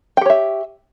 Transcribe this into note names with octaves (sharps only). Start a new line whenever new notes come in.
G4 C#5 E5 G5